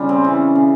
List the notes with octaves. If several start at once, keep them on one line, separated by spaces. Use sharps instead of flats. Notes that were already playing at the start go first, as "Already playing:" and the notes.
Already playing: C#3 G3 F4
C4
E3 C#4
C#3